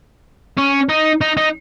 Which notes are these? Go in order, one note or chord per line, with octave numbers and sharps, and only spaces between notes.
C#4
D#4
D#4
D#4